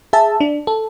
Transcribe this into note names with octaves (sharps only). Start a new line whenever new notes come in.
G#4 E5 A5
D4
A4